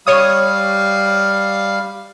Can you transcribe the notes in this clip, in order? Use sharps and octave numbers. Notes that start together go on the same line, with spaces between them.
G3 C#5 F5 D#6